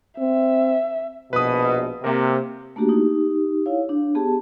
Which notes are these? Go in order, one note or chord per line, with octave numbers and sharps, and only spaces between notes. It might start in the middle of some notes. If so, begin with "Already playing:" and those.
C4 E5
A#1 B2 B4 D#6
C3 A#3 A#4
A3 A#3 D4 F#4 G4
D#4 G4
E4 C#5 F5
D4
B3 G4 G#4 A5